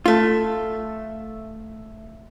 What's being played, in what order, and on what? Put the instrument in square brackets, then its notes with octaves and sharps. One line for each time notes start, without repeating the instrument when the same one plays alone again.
[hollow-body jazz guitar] A3 F4